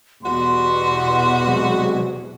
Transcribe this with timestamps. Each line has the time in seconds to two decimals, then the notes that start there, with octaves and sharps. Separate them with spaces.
0.24 E2 B2 G3 F#4 C6
1.47 C3 F#3 G#3